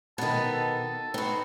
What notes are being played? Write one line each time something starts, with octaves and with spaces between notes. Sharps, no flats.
B2 D#3 B3 D#4 A5
A4
B3 C4 D#4 F#4